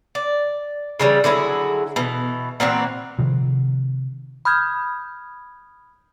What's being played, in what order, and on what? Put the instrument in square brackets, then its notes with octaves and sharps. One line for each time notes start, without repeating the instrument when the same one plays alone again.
[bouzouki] D5
C#3 E3 G3
D3 F#3 E4 G#4
B2 E3
A#2 E3 C4 F#4
[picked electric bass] C3 D#3 F3
[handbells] B5 D#6 F6 G6 G#6